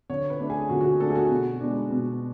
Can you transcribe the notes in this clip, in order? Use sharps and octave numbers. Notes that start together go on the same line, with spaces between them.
D3 C#5
B4
A3 D4
G#4
D3 F#4
F#4
G#4
A3 D4 A4
G#4
F#4
B2
G#3 B3 D4
B2